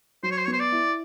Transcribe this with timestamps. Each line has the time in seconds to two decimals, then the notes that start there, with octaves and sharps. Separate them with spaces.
0.23 F#3 C5
0.31 C#5
0.37 C5
0.45 C#5
0.48 B3
0.53 C5
0.59 D5
0.72 E4